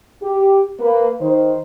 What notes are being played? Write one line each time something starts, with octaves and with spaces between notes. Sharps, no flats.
G4
A#3 B4
D#3 C5